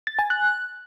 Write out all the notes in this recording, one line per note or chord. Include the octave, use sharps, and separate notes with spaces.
A6
G#5
F#6